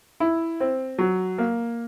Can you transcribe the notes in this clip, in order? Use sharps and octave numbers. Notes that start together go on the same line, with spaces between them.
E4
C4
F#3
A#3